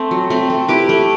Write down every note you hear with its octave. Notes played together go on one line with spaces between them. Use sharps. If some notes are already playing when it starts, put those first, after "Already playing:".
Already playing: A3 C4
F#3
A3 C4
A3
E4 G4 B4
A3